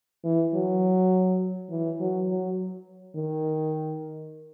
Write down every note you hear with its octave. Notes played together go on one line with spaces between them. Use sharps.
E3
F#3
E3
F#3
F#3
D#3